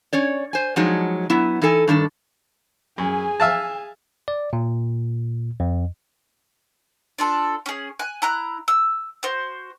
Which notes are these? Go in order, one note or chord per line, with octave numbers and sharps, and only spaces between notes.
C#4 C#5 D5
C5 G#5
F3 F#3 G#3 D#4
F#3 B3 E4
E3 D#4 A4 G#5
G2 D#3 D4 A4
F#2 G#4 G#5
E5 F5 A5
D5
A#2
F2
D4 F4 A4
C#4 G#4
G#5 F#6
E4 A#5 F#6
E6
F#4 C5